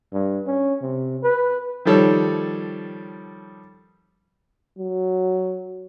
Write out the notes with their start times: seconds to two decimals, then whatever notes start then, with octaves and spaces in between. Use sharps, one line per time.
0.13 G2
0.47 C#4
0.82 C3
1.23 B4
1.85 D#3 F3 G3 A4 C#5
4.79 F#3